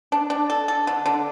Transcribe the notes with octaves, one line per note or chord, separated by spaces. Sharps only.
D4
D4
A4
A4
D3
D3